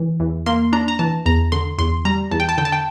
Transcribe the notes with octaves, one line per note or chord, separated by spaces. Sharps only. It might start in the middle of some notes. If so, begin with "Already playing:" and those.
Already playing: E3
E2
A#3 C6
D4 A#5
A#5
E3 A5
E2 A#5
D3 C6
E2 C6
G3 A#5
E2 A5
G5
A5
D3 G5
A5
G5